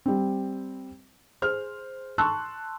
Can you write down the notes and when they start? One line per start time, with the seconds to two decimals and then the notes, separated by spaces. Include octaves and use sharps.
0.06 G3 C4
1.42 G#4 C5 F6
2.18 A5 C6 C#6 E6 F#6